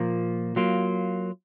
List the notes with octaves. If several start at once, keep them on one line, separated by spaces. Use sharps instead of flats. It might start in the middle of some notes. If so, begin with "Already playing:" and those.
Already playing: A#2 F3 A#3
F#3 A#3 F4